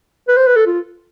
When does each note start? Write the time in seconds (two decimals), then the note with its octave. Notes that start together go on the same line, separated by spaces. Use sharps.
0.28 B4
0.37 C5
0.47 B4
0.56 A4
0.66 F4